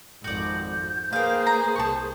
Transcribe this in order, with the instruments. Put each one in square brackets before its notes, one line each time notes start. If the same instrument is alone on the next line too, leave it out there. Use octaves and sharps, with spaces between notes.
[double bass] G#1 F2 [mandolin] F#4 D5 [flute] G6
[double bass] A#3 [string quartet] G#4 B4 C5 [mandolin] F5 G5
[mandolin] A#5
[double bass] C2 [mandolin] A5 C#6